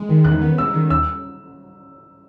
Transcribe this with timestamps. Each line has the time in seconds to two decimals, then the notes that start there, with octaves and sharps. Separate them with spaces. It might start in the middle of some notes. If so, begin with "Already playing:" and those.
Already playing: G#3
0.09 D#3
0.25 E2 F#6
0.41 B3
0.58 G#3 E6
0.74 D#3
0.90 D#2 E6